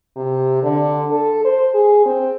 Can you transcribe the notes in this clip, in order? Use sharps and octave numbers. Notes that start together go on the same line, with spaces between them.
C3
D3
A4
C5
G#4
C4